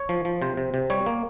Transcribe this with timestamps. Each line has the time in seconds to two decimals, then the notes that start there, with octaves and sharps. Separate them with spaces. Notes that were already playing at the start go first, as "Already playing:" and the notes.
Already playing: C#5
0.09 F3
0.25 F3
0.42 C3 C5
0.57 C3
0.74 C3
0.90 G3 C#5
1.06 A#3